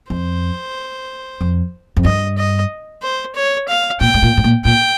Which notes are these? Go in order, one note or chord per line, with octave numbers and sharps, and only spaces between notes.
F2 C5
F2
F2
G2 D#5
D#5
C5
C#5
F5
A#2 G5
G#2
A#2
G#2
A#2
A#2 G5